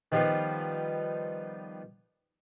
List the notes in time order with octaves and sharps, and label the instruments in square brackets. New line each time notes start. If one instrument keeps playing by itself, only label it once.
[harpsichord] D#3 F3 G3 B3 F4